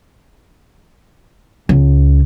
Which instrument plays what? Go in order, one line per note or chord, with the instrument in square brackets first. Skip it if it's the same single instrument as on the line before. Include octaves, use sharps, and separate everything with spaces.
[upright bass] C#2